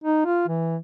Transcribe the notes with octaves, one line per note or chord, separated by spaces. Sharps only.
D#4
F4
E3